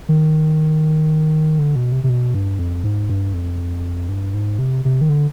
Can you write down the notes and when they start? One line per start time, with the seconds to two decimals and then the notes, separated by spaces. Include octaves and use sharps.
0.09 D#3
1.59 D3
1.76 B2
1.92 C3
2.04 C3
2.09 B2
2.34 G2
2.59 F2
2.84 G#2
3.09 G2
3.34 F2
4.09 G2
4.34 G#2
4.59 C3
4.85 C3
5.01 D#3
5.09 D3